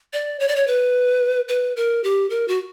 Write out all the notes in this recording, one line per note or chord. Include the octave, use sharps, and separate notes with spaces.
D5
C#5
D5
C#5
B4
B4
A#4
G4
A#4
F#4